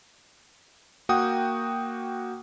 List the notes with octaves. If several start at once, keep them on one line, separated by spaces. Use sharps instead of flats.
A#3 F#4 F#5 G5 D#6